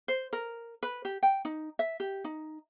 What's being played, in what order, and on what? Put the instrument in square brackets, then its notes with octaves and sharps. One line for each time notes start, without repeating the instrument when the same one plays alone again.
[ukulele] C5
A#4
B4
G4
G5
D#4
E5
G4
D#4